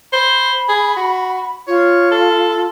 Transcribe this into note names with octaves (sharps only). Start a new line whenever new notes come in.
C5 B5
G#4
F#4
F4 C#5
A4